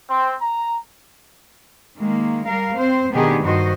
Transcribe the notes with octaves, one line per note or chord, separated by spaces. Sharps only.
C4
A#5
D#3 G#3 A#3
G3 A#4 F5
C4 C5
B2 D#3 B3 D4 G4 G#4
G2 D#3 F#4 C5 D#5